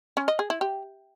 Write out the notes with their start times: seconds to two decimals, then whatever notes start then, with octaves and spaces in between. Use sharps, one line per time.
0.17 C#4
0.28 D#5
0.39 G#4
0.50 E4
0.61 G4